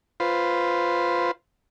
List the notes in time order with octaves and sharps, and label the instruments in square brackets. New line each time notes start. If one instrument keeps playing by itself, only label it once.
[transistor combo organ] F4 B4 C5